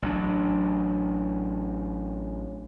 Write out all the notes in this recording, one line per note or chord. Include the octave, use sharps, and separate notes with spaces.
A1 F#3 D4